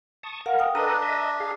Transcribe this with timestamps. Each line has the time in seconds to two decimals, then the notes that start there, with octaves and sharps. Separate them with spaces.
0.23 A5 C#6 D#6
0.46 A#4 F5 F#5
0.59 G5 D#6
0.75 D4 A4 B4 D#5 A#5
1.02 D#5 E5
1.40 G#4 F5